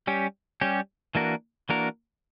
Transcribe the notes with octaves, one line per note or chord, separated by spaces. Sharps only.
G3 C#4 G4
G3 C#4 G4
E3 A#3 D4 F#4 A#4
E3 A#3 D4 F#4 A#4